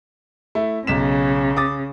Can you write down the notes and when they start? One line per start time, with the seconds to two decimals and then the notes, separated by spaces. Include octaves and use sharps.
0.55 A3 E4
0.87 B1 C#3 B6 E7
1.56 D6 D#6 A6